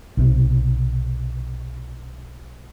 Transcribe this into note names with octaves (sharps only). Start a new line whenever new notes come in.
B1 C3